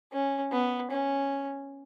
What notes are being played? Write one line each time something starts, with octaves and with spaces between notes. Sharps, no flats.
C#4
B3
C#4